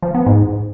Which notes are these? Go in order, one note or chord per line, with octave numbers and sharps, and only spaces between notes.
F3
B3
G#2